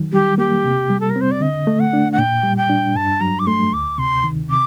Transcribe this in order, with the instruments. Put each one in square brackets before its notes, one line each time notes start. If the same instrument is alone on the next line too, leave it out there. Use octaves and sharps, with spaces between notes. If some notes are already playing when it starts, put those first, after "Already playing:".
Already playing: [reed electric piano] D#3 F#3
[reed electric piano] G3 [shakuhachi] G4
[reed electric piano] A#3 [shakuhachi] G4
[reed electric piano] C3
G3
[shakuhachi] A4
A#4
[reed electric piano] C4
[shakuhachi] C5
D5
[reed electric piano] D3 [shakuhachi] D#5
[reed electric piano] A3
[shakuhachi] F#5
[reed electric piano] D4
[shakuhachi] F#5
[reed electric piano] A#2 [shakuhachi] G5
[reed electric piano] G3
[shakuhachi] G5
[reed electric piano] D4
[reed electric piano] G2 [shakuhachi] A5
[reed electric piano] F#3 [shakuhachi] A#5
[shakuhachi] D6
[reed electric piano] A3 [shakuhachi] C6
[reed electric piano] D2 [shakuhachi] D6
[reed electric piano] C3 [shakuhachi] C6
[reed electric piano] D#3
[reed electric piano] C3 [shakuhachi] D6